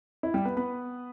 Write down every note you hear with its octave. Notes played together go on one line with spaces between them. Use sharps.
E4
G3 G4
B3 B4
B3 B4